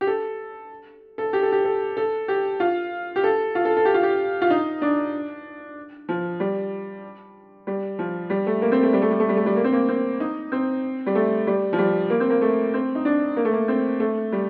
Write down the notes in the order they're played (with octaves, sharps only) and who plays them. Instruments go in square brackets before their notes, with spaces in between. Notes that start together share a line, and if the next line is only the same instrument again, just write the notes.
[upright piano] G4
A4
A4
G4
A4
G4
A4
A4
G4
F4
G4
A4
F4
A4
A4
G4
F4
G4
F4
D#4
D4
F3
G3
G3
F3
G3
A3
A#3
C4
A3
G3
A3
G3
A3
G3
A3
G3
A#3
C4
A#3
C4
D#4
C4
G3
A3
G3
F3
G3
A#3
C4
A#3
A3
C4
D#4
D4
A#3
A3
A#3
C4
A3
G3